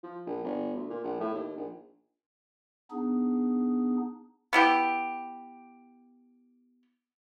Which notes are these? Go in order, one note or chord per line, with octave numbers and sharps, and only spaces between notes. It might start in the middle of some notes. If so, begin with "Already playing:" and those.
F3
A#1
G1
D2
A#2
A#1
A2
D#2
A#1
B3 D4 D#4 G#4
B3 E4 G4